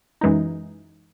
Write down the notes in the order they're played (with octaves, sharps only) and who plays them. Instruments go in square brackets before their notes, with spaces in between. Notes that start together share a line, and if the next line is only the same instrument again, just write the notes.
[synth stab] F#2 E3 G#3 D#4